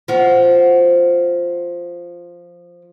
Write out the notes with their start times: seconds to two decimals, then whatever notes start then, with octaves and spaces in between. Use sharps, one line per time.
0.08 F3 F#4